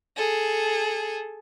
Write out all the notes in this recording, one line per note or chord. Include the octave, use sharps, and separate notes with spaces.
G#4 A4